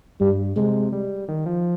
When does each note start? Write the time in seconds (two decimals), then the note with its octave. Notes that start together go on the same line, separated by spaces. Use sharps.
0.20 G2 G3
0.56 C3 G#3
0.92 G3
1.28 D#3
1.46 F3